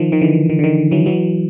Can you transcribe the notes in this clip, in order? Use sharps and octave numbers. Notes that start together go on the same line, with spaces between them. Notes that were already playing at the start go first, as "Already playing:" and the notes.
Already playing: D#3 F3
D#3
D3 E3
D#3
D3
D#3
E3 F#3
E3 F#3